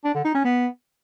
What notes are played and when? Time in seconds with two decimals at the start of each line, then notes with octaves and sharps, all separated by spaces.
0.05 D4
0.15 D3
0.24 D#4
0.34 C#4
0.44 B3